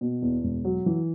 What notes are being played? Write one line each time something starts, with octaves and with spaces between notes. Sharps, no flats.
B2
E2
E1
F#3
E3